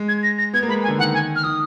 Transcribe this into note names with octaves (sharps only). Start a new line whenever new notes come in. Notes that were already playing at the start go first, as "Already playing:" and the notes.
Already playing: G#3
G#6
A#6
A#6
B3 G#6
A#3
G#3 B5
G#5
D3
D#3 F#5
G#5
F6
D#3 D#6